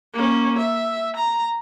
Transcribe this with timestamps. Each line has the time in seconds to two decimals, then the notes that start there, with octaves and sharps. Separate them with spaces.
0.14 A#3 C#4
0.58 E5
1.16 A#5